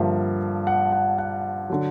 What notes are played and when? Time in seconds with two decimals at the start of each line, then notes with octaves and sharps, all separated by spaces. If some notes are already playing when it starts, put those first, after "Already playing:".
Already playing: G2 D3 F3 A#3 E5
0.67 F#5
0.92 F#5
1.18 F#5
1.70 D3 F#3